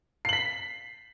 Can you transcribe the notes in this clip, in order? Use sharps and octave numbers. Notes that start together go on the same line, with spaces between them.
B6 C7 F#7